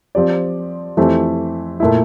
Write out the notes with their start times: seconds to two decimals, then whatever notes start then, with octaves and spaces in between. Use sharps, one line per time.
0.15 F3 C4 G4 D5
0.97 F2 E3 A3 C4 G4
1.80 A#2 A3 E4